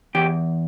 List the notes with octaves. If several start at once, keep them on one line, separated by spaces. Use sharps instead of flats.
E2 G4